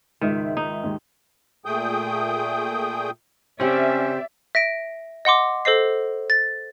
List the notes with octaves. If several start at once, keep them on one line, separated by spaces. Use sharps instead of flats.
C#2 G#2 D#3 E5
D#4
D#2 G#2
A#2 A3 G#4 G5 D#6 G6
C#3 C4 C#4 G4 C5 D5 E5
E5 A#6 D7
D#5 F#5 C6 D6
A4 C5 D#5 C7
A6